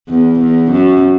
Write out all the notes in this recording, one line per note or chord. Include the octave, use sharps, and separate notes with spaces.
E2
E2
F#2